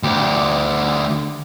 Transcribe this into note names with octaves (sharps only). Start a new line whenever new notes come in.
D2 G4